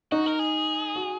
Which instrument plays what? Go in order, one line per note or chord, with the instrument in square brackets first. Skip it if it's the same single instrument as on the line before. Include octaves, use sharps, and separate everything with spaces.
[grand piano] D#4 [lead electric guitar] F#4
[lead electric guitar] A#4
G#4
[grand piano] F#4